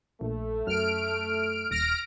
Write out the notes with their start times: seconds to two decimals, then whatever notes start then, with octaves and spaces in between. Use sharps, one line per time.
0.21 A#1 A3
0.67 F#2 F6 D7
1.71 D#1 F6 A#6 D7